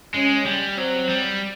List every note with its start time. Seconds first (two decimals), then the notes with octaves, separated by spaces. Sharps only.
0.14 G#3 C#4
0.46 G3
0.77 F#3 C4
1.09 G3